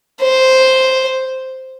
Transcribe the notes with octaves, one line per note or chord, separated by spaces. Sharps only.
C5